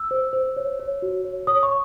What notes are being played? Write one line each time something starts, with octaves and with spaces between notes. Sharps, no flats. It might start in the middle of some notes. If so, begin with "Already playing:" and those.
Already playing: E6
C5
C5
C#5
C#5
F#4
C#5
C#5 D#6
C#6